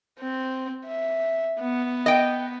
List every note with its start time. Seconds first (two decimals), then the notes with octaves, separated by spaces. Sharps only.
0.20 C4
0.86 E5
1.60 B3
2.06 D#5 G5